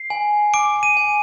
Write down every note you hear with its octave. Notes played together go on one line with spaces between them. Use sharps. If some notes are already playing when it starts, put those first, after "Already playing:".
Already playing: C7
G#5
D6 D7
D#7
G#5